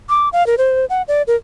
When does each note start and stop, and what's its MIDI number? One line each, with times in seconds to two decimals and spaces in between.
0.09 0.29 86
0.33 0.46 77
0.47 0.55 70
0.58 0.85 72
0.90 1.02 78
1.08 1.22 74
1.27 1.36 70